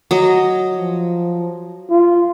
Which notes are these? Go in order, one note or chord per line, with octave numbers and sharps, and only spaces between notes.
F#3 D#5
F3
F4